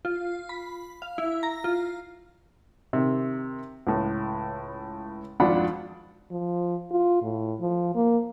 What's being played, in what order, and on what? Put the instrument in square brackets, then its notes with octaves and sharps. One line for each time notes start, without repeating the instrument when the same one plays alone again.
[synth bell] F4
B5
F5
E4
A#5
F4
[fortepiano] C3 D#3
C#2 A2
G#1 F2 D4 F4 F#5 B5
[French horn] F3
F4
A2
F3
A#3